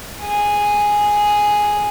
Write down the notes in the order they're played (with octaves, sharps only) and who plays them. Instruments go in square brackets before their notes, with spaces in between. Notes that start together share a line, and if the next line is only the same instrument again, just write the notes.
[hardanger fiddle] G#4